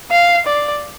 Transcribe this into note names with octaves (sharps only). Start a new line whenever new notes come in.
F5
D5